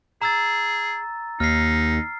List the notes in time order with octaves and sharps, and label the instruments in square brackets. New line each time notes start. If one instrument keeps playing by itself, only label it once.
[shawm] G#4 [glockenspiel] A#5 E6 A6
[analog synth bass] D#2 [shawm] D#4 [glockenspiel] F6 C7